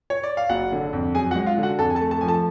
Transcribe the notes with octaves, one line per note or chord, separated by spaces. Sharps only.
C#5
D5
F5
F#1 F#4 F#5
D3
F2
F#2 G#4 G#5
F#4 F#5
G#3
F4 F5
D3
F#4 F#5
F2 A4 A5
G#5
A4 A5
A3
A4 A5
F3 G#5
A4 A5